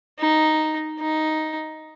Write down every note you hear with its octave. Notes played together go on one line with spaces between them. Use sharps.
D#4
D#4